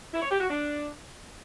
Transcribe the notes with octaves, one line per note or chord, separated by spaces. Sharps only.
E4
C#5
G4
F#4
D4